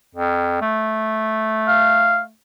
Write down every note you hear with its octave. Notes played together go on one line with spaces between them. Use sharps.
F2
A3
F5